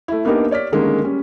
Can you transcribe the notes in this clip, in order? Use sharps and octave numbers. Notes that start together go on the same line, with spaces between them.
A3 E4
A#3 B3 D4 D#4 G4 A#4
C#5 D5 F6 B6
D3 D#3 G3 G#3 A#3 C#4
G3 C#4